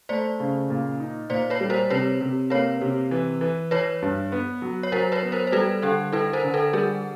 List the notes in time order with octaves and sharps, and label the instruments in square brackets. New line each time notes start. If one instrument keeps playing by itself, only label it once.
[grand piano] A3 [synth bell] C5 D5
[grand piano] C#3
A#2
D#4
[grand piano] A#2 [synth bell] C5 D5
[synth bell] B4 C#5
[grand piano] G3
[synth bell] A#4 C5
[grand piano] C3 [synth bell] B4 C#5
[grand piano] C3
[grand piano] A#3 [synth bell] B4 C#5
[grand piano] C3
E3
E3
[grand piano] E3 [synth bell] B4 C#5
[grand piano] G2
B3
F#3
[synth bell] C#5
[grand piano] F#3 [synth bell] A#4 C5
[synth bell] B4 C#5
[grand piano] B3
[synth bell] A#4 C5
C5
[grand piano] G3 [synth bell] A4 B4
[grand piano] D3 [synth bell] G4 A4
[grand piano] E4 [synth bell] A4 B4
[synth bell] A#4 C5
[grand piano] D3
[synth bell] A4 B4
[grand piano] G3 [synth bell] G#4 A#4